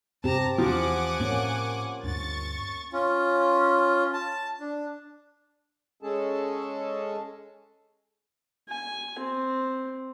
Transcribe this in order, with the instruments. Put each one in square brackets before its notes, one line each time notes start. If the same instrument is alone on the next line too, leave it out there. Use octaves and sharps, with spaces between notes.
[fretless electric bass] G2 C3 [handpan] C4 G4 [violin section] A5 A#5 A#6
[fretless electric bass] E2 E3 A3 [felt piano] F3 [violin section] F#5 G#5 D6
[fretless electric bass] A2 [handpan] A#3 C#4
[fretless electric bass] D2 G2 [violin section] C#6 A6
[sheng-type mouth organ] C#4 F4
A5
D4
[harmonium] G#3 C#4 G#4 A4 A5
[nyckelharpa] G#5
C4